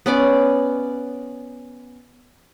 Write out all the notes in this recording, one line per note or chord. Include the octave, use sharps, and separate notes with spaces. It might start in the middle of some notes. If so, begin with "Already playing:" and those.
B3 C#4 D5